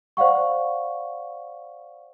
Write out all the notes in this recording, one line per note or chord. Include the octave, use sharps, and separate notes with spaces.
C5 D5 F5 F#5 C#6